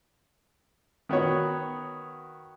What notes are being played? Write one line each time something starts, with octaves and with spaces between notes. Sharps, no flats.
D#3 B3 F#4 C#5